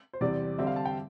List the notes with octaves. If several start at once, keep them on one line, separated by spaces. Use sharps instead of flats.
C5
E2 C3 G3 C4 D5
D3 G3 C4 E5
F5
A5
G5